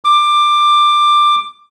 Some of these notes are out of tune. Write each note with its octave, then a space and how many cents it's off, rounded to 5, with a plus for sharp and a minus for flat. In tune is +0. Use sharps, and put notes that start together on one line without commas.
D6 +15